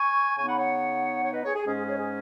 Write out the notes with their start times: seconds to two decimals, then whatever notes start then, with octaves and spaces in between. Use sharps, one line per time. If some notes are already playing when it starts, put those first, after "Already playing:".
Already playing: G#5 C#6
0.37 C#3 B3 D#4 G#5 C#6
0.48 F#5 B5
0.59 C#5 F#5
1.23 C#5
1.33 B4 D#5
1.45 G#4 C#5
1.55 G#4
1.66 G#2 G#3 C#4 G#4
1.76 G#4
1.87 G#4 C#5
1.99 G#4